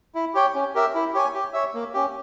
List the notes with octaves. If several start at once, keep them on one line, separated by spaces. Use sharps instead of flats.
E4
G4 C#5 G5
C#4
G4 A#4 E5
E4
G4 C#5 G#5
G4
C#5 E5
A#3
C#4 G4